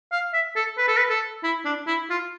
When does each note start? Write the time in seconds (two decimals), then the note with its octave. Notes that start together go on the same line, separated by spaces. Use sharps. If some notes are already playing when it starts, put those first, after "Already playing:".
0.12 F5
0.34 E5
0.56 A4
0.78 B4
0.88 A4
0.98 B4
1.10 A4
1.44 E4
1.65 D4
1.87 E4
2.10 F4